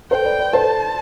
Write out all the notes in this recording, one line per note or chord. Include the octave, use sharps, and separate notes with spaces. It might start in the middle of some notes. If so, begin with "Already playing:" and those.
A4 C5 G5
B4 D5
B4 D5
A4 C5 A5